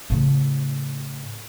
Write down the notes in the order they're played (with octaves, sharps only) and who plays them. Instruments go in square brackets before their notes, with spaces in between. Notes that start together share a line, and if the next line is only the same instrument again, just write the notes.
[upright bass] A2 C#3